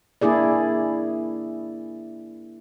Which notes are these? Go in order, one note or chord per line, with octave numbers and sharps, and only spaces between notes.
A#3 D4 E4 G#4 D5